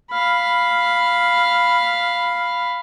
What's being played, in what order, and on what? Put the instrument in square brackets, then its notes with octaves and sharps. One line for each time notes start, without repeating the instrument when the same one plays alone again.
[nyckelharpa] F5 B5